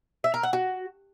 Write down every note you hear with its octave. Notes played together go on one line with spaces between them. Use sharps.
E5
A#4
F#5
F#4